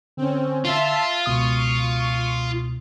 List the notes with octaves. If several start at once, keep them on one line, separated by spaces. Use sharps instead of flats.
D3 C4 C#4
F4 E5 A5 C6
C#2 B2 C#6 D#6 D#7